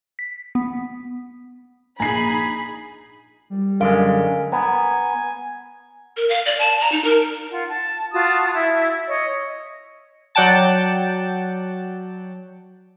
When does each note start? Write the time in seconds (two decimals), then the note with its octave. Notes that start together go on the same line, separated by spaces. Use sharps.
0.19 B6
0.55 B3
2.00 A#1 D#4 G#4 G#5 A#5 B5 C7
3.50 G3
3.80 F#2 D3 G#3 A#4 F5 D7
4.52 B3 G#5 A#5
6.17 A#4
6.29 F5
6.46 D5
6.59 A5
6.80 A#5
6.92 D#4
7.04 A#4
7.51 F4 F#5
7.67 A5
8.12 F4 F#4 A5 D#6
8.55 E4 E5
9.07 C#5 D#5
10.35 F#3 D5 F#5 G5 A5 A6